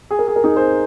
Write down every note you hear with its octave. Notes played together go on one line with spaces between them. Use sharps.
G#4
A#4
G#4
A#4
D#4 G#4
G#4 C5